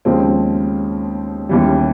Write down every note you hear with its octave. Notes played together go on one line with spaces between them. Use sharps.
D#2 C#3 F3 G#3 C4
D#2 C#3 E3 G3